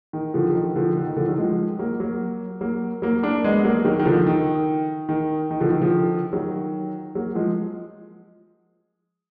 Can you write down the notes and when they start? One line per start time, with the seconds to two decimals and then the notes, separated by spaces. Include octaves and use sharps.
0.13 D#3
0.34 D3 F3
0.50 F3
0.55 D#3
0.76 D3 F3
0.97 D3
1.06 D#3
1.16 D3 F3
1.28 D#3 F#3
1.38 F3 G#3
1.79 F#3 A#3
2.00 F#3 A#3
2.61 F#3 A#3
3.02 F#3 A#3
3.23 A#3 D4
3.44 G#3 B3
3.64 F#3 A#3
3.85 D#3 F#3
3.99 D#3
4.06 D3 F3
4.26 D#3
5.09 D#3
5.51 D#3
5.61 D3 F3
5.71 D#3
5.81 D3 F3
6.33 D#3 F#3
7.15 F#3 A#3
7.35 F3 G#3